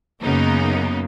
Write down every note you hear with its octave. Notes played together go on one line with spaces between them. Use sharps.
F#2 C#3 A#3 B3 D#4